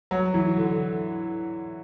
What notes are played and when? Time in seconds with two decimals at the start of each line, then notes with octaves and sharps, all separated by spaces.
0.11 F#3
0.34 E3
0.57 D3